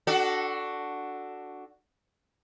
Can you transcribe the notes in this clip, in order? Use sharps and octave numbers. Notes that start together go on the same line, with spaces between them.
D4 F#4 A4